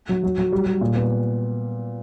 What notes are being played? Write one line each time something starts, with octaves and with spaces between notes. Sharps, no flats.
F#3
F#3
F#3
G3
G3
A#2
B3